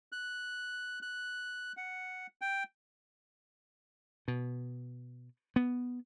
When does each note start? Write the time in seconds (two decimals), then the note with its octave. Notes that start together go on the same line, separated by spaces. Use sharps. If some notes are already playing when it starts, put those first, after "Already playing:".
0.12 F#6
1.02 F#6
1.77 F#5
2.41 G5
4.28 B2
5.56 B3